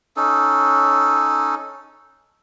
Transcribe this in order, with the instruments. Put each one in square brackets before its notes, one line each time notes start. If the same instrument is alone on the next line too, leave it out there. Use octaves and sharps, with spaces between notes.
[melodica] C#4 D#4 A4